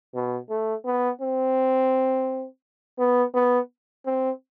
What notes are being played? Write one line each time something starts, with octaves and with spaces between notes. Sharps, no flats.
B2
A3
B3
C4
B3
B3
C4